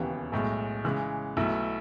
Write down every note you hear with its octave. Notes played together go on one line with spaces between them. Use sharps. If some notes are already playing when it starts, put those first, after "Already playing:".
Already playing: E1 D#2 C#3 E3 B3
B1 A2 G#3
C#3 E3 G#3
B1 B2 A3 E4